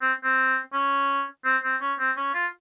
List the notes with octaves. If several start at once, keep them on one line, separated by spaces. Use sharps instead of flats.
C4
C4
C#4
C4
C4
C#4
C4
C#4
F4